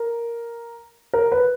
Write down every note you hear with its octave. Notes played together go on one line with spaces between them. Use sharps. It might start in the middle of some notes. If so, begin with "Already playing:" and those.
Already playing: A#4
A#4
B4